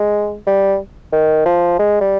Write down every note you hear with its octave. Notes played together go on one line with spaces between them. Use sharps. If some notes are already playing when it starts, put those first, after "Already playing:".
Already playing: G#3
G3
D#3
F3
G#3
G3